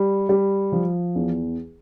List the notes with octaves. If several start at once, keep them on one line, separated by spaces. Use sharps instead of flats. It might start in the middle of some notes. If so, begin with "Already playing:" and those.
Already playing: G3
G3
F3
E2